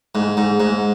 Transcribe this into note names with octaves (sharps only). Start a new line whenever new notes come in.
G#2
G#2
G#2